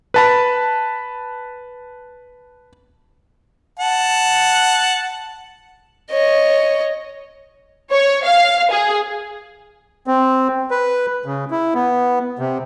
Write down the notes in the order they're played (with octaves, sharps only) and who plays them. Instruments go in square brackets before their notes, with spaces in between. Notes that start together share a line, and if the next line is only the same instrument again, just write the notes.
[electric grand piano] B4 A5 B5
[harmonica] F#5 A5
[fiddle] C#5 D#5
[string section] C#5
F5
G#4
[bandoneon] C4
B4
C#3
E4
B3
C3